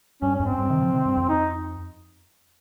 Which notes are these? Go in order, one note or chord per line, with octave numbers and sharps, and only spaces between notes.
G2 C#4
C#4
F2 G#2
C4
F2
G2
C3 D#3
C#3 F3
C3 D#3
G2
F2
D#4